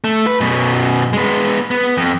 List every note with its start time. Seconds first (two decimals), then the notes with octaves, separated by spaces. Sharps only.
0.04 A3
0.27 B4
0.40 F#2 B2
1.13 G#3 B3
1.71 B3
1.97 F2